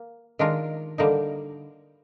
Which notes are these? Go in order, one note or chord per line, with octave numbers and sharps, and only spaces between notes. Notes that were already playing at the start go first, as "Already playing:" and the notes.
Already playing: A#3
D#3 G#3 D4 F4 A#4
D3 G3 A#3 D#4